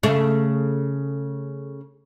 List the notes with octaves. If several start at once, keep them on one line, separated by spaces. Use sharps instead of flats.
C#3 A3